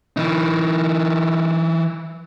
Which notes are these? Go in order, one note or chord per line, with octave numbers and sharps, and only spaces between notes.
E3 D#4